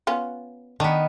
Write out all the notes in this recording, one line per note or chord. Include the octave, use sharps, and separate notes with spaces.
B3 C#4 F4
D#3 B3 D4